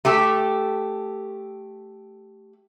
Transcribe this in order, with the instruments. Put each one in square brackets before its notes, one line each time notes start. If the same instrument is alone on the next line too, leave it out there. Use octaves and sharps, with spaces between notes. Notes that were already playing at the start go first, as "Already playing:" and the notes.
[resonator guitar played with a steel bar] A3 G4 A4